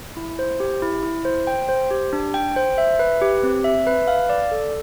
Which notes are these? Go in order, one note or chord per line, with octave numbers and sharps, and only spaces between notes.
E4
C5
G4
E4
E4
C5
G5
C5
G4
D4
G5
C5
E5
B4
G4
C4
E5
B4
F5
D5
A4